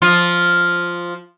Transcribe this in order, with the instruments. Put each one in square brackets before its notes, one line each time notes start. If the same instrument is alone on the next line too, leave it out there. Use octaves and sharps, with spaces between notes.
[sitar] F3 F4